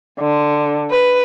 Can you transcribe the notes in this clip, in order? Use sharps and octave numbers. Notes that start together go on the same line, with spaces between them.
D3
B4